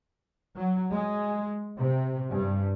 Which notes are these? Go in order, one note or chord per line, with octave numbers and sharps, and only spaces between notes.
F#3
G#3
C3
G2